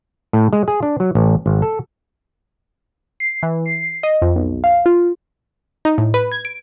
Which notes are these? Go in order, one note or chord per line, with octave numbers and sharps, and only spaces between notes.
A2
G#3
G#4
D4
F#3
A1
G#1
A4
C7
E3
C7
D#5
F2
B1
F5
F4
D#4
A2
B4
G#6
D7